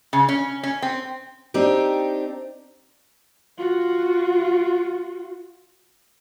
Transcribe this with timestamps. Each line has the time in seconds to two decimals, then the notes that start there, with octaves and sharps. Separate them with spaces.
0.13 C#3
0.29 C#4
0.63 C#4
0.82 C4
1.54 C4 D4 D#4 G4
3.57 F4 F#4